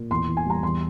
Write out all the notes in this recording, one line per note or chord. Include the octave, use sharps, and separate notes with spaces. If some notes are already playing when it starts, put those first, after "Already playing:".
Already playing: A#2
E2 C6
E3
G#5
G3 A#5
E2 C6